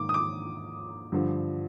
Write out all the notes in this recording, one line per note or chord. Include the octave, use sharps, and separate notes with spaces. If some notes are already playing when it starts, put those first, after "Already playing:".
Already playing: G#2 D#3 A#3 D6
D#6
D6
G2 D3 F3